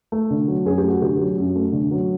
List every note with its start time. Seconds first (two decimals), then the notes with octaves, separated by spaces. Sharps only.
0.12 A3
0.30 D3
0.48 F#3
0.65 F#2 G#4
0.78 G4
0.83 A3
0.89 F#4
1.02 D3 G4
1.19 F#3
1.38 F#2
1.56 A3
1.72 D3
1.91 F#3